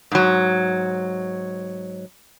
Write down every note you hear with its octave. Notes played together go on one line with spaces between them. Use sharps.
G#2 F#3